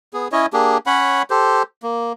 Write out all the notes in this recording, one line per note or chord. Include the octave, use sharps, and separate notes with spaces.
B3 G#4
C#4 E4 C#5 D#5
A#3 D4 G4 G#4
C#4 C#5 F#5 B5
G4 A4 C5
A#3